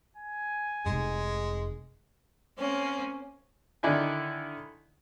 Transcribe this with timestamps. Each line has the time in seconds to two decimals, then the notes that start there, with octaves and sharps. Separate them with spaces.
0.16 G#5
0.86 F1 G#3 D#4
2.58 A#3 C4 C#4
3.83 D3 D#3 E4 D5 G#5